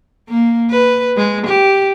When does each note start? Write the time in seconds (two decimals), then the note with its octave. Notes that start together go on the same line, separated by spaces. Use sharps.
0.29 A#3
0.70 B4
1.17 G#3
1.46 G4